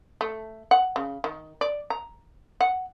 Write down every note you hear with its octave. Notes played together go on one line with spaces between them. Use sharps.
A3
F#5
C#3
D#3
D5
A#5
F#5